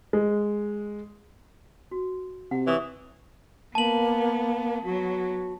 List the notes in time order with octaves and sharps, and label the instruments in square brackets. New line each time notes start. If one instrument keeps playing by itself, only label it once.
[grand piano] G#3
[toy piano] F#4
[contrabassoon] C3 [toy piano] F#5
[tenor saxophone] E3 [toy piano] C#5 C#6 D#6
[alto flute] A#3 [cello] B3 [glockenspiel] A5 F#7
[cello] F#3 B3 [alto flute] F#4